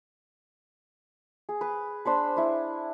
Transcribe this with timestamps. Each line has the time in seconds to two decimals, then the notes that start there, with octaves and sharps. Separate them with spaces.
1.49 G#4
1.61 B4
2.05 D4 C5 B5
2.36 E4 B4